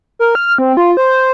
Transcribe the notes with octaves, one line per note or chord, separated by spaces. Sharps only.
A#4
F6
C4
F4
C5